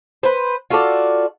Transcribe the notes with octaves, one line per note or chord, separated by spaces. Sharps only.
B4 C5
F4 F#4 A4 D5